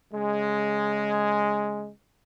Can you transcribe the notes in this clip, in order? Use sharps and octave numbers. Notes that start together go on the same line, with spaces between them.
C#3 G#3